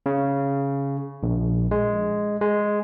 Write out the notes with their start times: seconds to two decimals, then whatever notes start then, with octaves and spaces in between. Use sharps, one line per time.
0.06 C#3
1.23 A#1
1.71 G#3
2.41 G#3